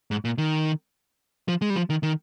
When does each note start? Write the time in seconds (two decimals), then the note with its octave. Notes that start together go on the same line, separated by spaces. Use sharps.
0.11 G#2
0.25 A#2
0.38 D#3
1.48 F3
1.62 G#3
1.70 G3
1.76 F3
1.90 D#3
2.03 D#3